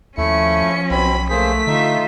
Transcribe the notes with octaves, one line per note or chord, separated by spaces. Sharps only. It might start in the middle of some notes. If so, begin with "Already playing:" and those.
D#2 F3 A3 C#4 E4 C#7
B1 B2 C4 B5
A3 A#3 G#4 C5 B6
D3 D#4 F4 E5